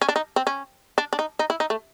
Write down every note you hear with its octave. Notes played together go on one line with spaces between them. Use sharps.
C#4
D4
D#4
C4
C#4
D4
D4
D#4
D#4
E4
D#4
A3